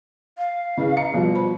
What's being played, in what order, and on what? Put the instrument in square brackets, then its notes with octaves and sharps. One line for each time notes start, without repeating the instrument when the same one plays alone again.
[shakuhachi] F5
[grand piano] C#3 [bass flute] E4 [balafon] G#4 B4 D#5
[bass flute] D#5 [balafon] A#5 [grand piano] C#7
[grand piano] B2 [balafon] F3 G3 G4 [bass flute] F4
[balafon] C5 B5